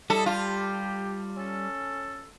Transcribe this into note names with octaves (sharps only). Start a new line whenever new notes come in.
G3 E4 A4 D#5
F4 G4
C#4 A4